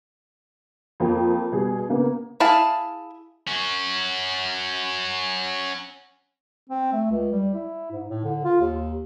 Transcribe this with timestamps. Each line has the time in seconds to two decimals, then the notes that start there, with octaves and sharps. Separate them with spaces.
1.00 F2 A#3 G5
1.52 B2 G3 G#4
1.89 C#3 A#3 B3
2.40 E4 G#4 F5 A5
3.48 C#4 F#4
6.70 C4
6.93 A3
7.11 C#2
7.32 G3
7.54 E4
7.92 G#2
8.10 A2
8.24 D3
8.45 F4
8.61 D#2